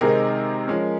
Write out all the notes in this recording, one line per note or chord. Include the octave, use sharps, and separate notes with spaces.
C3 D#3 G#3 C4 D#4 G#4 A#4
F3 G#3 C#4